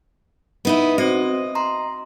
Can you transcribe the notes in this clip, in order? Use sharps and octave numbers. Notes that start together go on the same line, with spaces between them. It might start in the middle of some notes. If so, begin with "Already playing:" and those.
B3 D#4 E4
C4 F#4 C5 D#5
A#5 C6